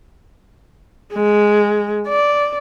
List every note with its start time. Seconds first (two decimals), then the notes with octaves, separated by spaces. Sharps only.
1.14 G#3
2.08 D5